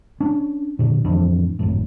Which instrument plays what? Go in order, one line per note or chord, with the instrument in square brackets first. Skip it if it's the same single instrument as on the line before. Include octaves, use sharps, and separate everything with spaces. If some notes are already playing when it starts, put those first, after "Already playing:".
[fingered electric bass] C#4 D4
A#2 D3
D1 F2 E3 D4
G#1 F#2 A2